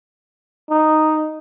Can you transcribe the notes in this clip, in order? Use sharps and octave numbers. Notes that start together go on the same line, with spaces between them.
D#4